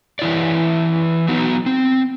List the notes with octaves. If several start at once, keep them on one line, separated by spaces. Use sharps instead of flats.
E3 E4 C#5 D5
F#3 B3 D#4
C4